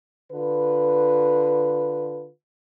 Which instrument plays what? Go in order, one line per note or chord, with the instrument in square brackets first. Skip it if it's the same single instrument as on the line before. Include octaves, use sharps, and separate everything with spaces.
[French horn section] D3 F4 B4